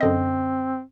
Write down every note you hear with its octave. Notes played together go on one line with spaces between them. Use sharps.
F#2 D3 C4 D#5